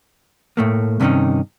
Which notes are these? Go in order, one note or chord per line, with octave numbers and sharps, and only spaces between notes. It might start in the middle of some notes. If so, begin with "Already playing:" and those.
A2 A3 A#3
G2 C3 D#3 B3 C#4 D#4